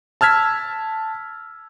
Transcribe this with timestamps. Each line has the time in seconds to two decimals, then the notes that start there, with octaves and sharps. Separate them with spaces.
0.21 A5 E6 F6 G#6 B6